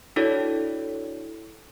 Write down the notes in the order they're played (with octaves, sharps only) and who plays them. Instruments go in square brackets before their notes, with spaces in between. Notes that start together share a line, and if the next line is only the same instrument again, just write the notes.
[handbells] D4 E4 F#4 A4 C#5 D5